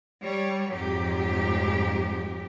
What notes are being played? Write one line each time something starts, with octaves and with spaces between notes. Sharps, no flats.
G3 C#5
F2 G#2 F#3 G4